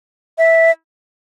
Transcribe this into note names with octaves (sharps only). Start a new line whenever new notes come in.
E5